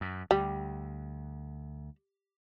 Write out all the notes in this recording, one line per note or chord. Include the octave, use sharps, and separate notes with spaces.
F#2
D2 G3